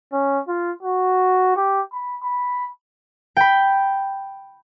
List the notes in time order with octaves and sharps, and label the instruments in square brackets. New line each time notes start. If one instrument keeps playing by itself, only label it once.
[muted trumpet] C#4
F4
F#4
G4
B5
B5
[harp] G5 B5